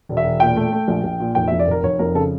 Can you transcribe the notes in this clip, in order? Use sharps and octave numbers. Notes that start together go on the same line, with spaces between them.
E1
E5
E1
A#2 G5
A3
A3
A#1
A#1
A#2
F1 G5
F2 E5
D5
F1 A#4
F1 C#5
F2 A#4
C#3 A4